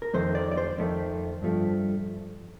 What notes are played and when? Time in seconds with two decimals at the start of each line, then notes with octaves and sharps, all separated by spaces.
0.02 A#4
0.14 F2 D#3 A3 C5
0.35 D5
0.51 D5
0.57 C5
0.78 F2 D#3 A3
1.42 G2 F3 A3